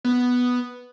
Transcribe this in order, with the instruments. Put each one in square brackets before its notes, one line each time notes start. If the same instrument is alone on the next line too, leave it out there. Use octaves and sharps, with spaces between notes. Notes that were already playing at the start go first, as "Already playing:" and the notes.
[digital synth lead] B3